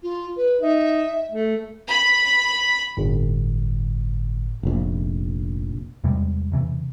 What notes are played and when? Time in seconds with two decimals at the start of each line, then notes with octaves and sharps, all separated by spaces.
0.03 F4
0.37 B4
0.61 D#4 E5
1.31 A3
1.88 B5
2.97 G1 A2
4.63 F1 A#1
6.04 E2 C3 G3 G#3
6.52 E1 C3 E3